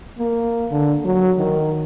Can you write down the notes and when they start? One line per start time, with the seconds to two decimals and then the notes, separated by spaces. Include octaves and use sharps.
0.19 A#3
0.71 D3
1.05 F#3
1.38 D#3